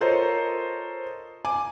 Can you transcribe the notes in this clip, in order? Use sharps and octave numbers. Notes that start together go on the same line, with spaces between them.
F4 A4 A#4 C5 C#5 D#5
G#5 D6